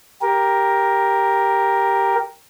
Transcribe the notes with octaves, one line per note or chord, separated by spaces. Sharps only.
G4 A#4